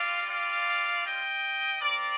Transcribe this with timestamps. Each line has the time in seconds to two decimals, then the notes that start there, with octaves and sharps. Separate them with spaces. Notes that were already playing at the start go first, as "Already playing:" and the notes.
Already playing: G3 C4 F4 D5 F5
0.29 D5 F5
1.05 D#5 G5
1.82 C4 F4 A#4 D5